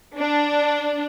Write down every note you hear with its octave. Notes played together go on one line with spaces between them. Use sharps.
D4